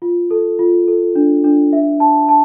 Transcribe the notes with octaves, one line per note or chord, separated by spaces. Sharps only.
F4
A4
F4
A4
D4
D4
E5
A5
A5